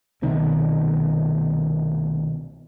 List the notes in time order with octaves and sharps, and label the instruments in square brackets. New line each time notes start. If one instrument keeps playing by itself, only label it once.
[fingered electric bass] C2 B2 D#3